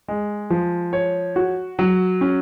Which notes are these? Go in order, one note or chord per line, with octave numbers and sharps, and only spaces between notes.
G#3
F3
C#5
F#4
F#3
C#4